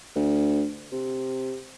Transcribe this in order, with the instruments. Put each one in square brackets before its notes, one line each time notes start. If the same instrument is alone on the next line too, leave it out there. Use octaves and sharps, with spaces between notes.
[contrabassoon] D2
C3